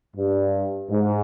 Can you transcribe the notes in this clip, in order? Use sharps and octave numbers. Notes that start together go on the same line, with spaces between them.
G2
G#2